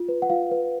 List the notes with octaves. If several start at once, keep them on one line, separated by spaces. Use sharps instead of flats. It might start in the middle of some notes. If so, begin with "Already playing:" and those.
Already playing: F4
B4
F#5
F4 F5
B4